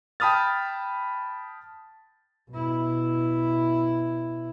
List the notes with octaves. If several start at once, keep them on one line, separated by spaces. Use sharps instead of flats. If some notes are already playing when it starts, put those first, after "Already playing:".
G5 A5 B5 D#6 F6 A6
B2 E4